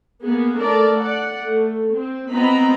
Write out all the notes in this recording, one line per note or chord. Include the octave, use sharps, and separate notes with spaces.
A#3 B3 G#4
A3 D4 A#4 D5
D5 F#5
A3
C4
B3 C4 F4 D#5 A#5 B5